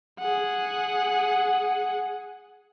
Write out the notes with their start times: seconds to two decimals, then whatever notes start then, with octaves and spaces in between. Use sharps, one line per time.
0.20 G#4 F#5